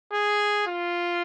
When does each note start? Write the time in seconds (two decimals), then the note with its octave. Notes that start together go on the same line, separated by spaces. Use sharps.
0.13 G#4
0.67 F4